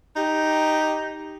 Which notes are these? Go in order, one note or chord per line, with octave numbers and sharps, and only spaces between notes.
D#4 G4